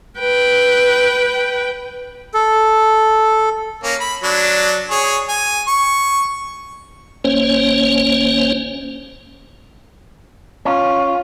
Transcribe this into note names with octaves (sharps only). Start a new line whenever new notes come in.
B4 G5
A4
A#3 C#4
B5
F#3 D4
G#4 C#5
G#5
C#6
G#1 A#3 C#4 C5 C#5
C#4 F4